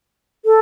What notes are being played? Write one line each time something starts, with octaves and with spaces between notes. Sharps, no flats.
A4